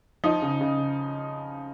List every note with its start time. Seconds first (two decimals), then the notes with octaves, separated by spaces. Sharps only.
0.24 F3 D#4
0.42 C#3
0.61 C#3